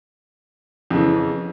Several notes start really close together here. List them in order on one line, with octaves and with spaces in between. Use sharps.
F2 C#3 E3